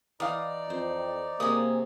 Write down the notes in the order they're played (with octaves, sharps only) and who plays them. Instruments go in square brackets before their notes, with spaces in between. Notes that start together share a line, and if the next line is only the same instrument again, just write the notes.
[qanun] E3 [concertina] D#4 D5 [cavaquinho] F5 D#6
[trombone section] F2 [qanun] C5
[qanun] C3 G#3 G#5 [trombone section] A#3 [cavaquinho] G#4 D#6